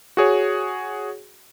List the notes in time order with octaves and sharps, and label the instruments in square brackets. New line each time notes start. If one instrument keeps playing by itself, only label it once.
[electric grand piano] F#4 G#4 C#5